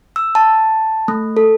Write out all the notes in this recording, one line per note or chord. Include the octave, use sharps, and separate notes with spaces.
E6
A5
A3
A4